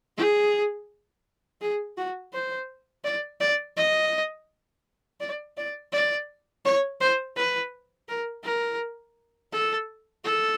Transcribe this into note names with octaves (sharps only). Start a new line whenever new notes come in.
G#4
G#4
F#4
C5
D5
D5
D#5
D5
D5
D5
C#5
C5
B4
A#4
A#4
A4
A4